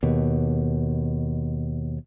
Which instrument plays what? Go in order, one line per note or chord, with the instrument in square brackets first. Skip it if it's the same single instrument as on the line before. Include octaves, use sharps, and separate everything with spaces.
[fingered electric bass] D#2 B2